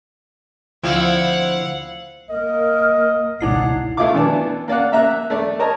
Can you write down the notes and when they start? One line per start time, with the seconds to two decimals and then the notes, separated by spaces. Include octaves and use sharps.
0.83 D2 F3 C4 E4 F5 F#5
2.30 A#3 A#4 D#5
3.41 G#1 C#2 B2 D#4 E4 F#5 C7
3.97 A3 E4 F4 F5 D6
4.14 B2 E3 B3 D4 A5
4.68 A#3 D5 F5 F#5
4.92 A#3 E5 A#5 F#6
5.30 A3 D5
5.59 A#4 C#5 D#5 A5 A#5